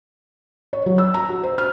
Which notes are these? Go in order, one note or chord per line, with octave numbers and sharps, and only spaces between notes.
C#5
F#3
E6
A#5
F#4
C5
F6